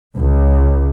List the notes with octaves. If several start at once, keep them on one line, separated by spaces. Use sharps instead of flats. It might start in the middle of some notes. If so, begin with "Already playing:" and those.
C#2